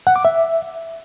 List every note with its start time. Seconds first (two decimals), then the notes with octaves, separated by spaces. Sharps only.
0.07 F#5
0.16 D6
0.25 E5